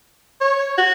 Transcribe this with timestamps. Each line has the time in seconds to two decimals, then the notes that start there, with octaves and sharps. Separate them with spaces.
0.41 C#5
0.78 F#4